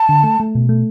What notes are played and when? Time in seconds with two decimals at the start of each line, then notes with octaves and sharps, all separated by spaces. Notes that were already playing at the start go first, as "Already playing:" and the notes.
Already playing: A5
0.09 D3
0.23 A3
0.40 A3
0.55 B2
0.69 A3